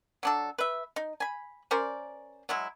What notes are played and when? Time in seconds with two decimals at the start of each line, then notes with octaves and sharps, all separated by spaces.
0.23 F#3 D4 A4
0.58 B4 E5
0.96 D#4
1.20 G#5 B5
1.71 C#4 A#4 C5 D5
2.49 F#3 G#3 E4